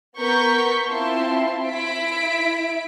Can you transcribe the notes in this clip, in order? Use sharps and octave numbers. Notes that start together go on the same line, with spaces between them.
B3 A#4 C#6 G6 B6
C4 E4 F4 E5 A5 C6
E4 B6 D7